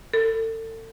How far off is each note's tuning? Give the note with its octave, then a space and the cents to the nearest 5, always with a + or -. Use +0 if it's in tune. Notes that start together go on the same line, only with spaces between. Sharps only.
A4 +35